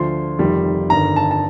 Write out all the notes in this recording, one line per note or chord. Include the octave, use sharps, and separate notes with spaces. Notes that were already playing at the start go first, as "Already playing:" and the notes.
Already playing: D2 D3 F3 C6
F1 F2 D#3 G3
G1 G2 D#3 A#5
A5
A5